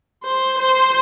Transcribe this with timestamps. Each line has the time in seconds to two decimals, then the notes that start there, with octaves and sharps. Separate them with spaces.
0.23 C5
0.58 C5